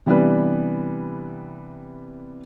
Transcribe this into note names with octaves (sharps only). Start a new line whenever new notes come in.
C3 E3 G3 B3 D4 B4